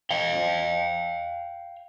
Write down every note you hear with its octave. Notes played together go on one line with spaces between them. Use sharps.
F5 G5